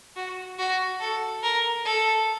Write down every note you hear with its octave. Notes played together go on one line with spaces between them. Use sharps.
F#4
F#4
A4
A#4
A4